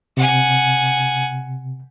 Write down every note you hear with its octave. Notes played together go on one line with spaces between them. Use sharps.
C3 F#5 G#5